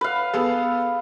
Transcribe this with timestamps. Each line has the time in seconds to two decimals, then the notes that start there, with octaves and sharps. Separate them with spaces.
0.01 B4 F5
0.34 B3 G#4 A4